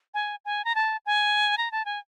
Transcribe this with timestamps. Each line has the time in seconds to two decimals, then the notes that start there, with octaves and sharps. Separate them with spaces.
0.14 G#5
0.45 G#5
0.65 A#5
0.75 A5
1.06 G#5
1.58 A#5
1.72 A5
1.85 G#5